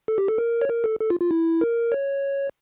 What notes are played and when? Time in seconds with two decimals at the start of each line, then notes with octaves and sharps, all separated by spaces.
0.08 A4
0.18 G4
0.28 A4
0.38 A#4
0.62 C#5
0.69 A#4
0.84 A4
1.00 A4
1.10 F4
1.21 F4
1.31 E4
1.61 A#4
1.92 C#5